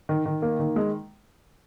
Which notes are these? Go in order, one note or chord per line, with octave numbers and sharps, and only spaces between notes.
D#3
D#3
A#3
D#3
G#3